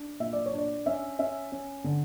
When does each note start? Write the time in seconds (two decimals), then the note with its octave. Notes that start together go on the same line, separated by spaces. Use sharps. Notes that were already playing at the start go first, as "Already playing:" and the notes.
Already playing: D4
0.20 A#2 E5
0.33 D5
0.46 C#5
0.53 D4
0.58 D5
0.86 C#4 E5
1.19 C#4 E5
1.52 C#4
1.84 D3